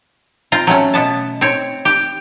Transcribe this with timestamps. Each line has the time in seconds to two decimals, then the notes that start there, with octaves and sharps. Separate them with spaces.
0.52 C4 F4 A#5
0.67 F#3 A3 C#4
0.94 B2 B3 A5
1.41 C4 C#5
1.85 G4